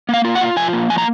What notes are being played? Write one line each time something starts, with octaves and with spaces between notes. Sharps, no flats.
A#3 F5
F4
F#5
F4
F3 G#5
A#3
F3 G#5
A#5